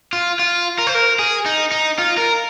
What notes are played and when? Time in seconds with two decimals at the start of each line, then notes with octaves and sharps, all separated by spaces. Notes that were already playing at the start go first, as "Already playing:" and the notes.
0.13 F4
0.39 F4
0.79 A#4
0.87 C5
0.95 A#4
1.19 G#4
1.46 D#4
1.72 D#4
1.99 F4
2.18 A#4